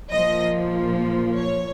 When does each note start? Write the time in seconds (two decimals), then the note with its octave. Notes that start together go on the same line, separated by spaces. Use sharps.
0.11 A#1 A#2 F3 A#3 D#5
1.39 C#5